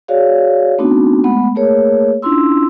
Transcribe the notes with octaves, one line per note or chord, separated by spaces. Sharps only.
F#4 G#4 C#5 D5 F5
A3 B3 C4 D4 D#4 F#4
G#3 A3 B3 F#5 B5
A3 A#3 G#4 A#4 C#5
C#4 D4 E4 F4 C6 E6